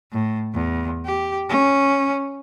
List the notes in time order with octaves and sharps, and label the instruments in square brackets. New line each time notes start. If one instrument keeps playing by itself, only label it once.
[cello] A2
E2
G4
C#4